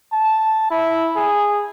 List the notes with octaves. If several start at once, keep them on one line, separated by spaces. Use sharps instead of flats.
A5
E4
G#4